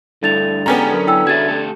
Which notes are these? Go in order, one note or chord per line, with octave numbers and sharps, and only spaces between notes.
G2 D3 A3 E4 A6 F7
G#3 B3 C#4 G4 A#5
F#2 A#4
E4 G5 E6
F#4 G#4 E5 G#6 A6
A3 G4 A4